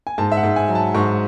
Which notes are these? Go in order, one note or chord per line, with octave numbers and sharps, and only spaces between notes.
G#5
G#2 A5
E5
F#5
G#2
G#5
F#3
A5
G#2 C#6